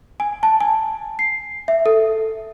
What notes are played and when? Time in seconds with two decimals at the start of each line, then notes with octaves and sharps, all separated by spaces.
0.20 G#5
0.43 A5
0.60 G#5
1.19 C7
1.68 E5
1.86 A4